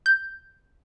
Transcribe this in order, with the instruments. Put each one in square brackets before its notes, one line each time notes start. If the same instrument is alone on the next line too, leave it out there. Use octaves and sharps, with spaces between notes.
[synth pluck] G6